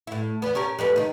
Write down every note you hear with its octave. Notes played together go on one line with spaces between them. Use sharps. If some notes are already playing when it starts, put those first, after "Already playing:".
A2 E4
E2 B3
C#4 G4 A#4
F2 G4 B4
D#3 D#4